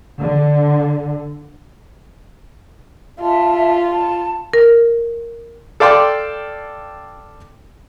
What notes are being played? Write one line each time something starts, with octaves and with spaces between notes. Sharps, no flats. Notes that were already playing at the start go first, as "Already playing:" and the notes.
D3
F4 E5 A5
A5
A#4
A4 D5 F5 G5 C6 D6